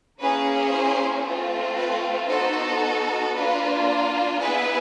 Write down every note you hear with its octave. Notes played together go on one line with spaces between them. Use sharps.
A#3 C#4 E4 G#4 B4
C5
A3 C4 F4
B4
B3 D#4 F#4 A4 C5
A#3 D4 F4 B4
B3 E4 G#4 B4